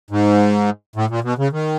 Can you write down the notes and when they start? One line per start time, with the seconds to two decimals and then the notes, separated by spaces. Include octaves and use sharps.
0.10 G#2
0.96 A2
1.10 A#2
1.24 B2
1.38 C#3
1.52 D#3